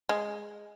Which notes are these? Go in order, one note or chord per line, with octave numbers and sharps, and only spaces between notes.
G#3